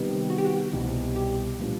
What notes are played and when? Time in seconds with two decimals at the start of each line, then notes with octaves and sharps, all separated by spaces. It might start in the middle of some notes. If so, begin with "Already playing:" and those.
Already playing: C3 D#3 G3 B3
0.30 F#4
0.38 G4
0.45 F#4
0.73 C2 B2 G3
1.16 G4
1.59 A#2 G3 B3 D4 F4